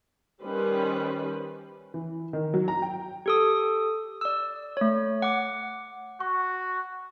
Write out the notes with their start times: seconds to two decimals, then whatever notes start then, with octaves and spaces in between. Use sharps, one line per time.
0.42 D#3 G3 C#4 B4 C5
1.94 E3
2.33 D#3
2.54 F#3
2.68 A#5
2.82 G5
3.26 G4 A4 D#6
4.21 D5 E6
4.77 A3 C#5
5.22 F#5 D6
6.20 F#4 C#6